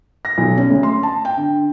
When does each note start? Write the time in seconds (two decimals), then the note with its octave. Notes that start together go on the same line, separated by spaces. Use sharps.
0.25 A#6
0.38 B1
0.58 C#4
0.70 D2
0.83 C6
1.03 A5
1.25 G5
1.37 D3